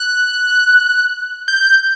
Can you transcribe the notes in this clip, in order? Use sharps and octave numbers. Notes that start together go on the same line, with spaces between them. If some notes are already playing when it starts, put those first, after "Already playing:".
Already playing: F#6
G6